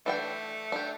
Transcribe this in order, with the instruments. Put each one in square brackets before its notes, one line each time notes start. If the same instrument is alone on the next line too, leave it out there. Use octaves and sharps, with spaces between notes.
[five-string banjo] E3 D4 G5 [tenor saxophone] A3
[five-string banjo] D4 G4